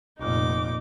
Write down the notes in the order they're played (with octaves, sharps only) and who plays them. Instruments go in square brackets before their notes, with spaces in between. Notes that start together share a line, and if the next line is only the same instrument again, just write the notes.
[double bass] F1 A#2 [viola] D#4 D6